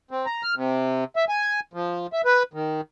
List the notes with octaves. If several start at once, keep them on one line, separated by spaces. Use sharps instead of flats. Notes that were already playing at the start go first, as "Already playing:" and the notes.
C4
A#5
F6
C3
E5
G#5
F3
E5
B4
D#3